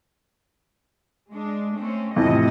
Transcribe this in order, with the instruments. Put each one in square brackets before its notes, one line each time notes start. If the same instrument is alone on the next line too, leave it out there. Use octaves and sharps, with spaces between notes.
[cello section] G#3 D4
A3 C4 C#4
[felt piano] F2 E3 [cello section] A2 C3 D#5